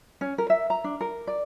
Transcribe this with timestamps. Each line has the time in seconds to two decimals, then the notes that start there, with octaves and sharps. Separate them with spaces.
0.21 C#4
0.38 A#4
0.50 E5
0.70 A#5
0.84 D4
1.01 A#4
1.27 D5